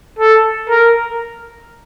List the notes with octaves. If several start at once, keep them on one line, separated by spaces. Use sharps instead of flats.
A4
A#4